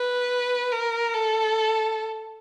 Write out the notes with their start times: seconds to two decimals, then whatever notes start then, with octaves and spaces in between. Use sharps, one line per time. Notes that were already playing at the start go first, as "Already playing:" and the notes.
Already playing: B4
0.71 A#4
1.14 A4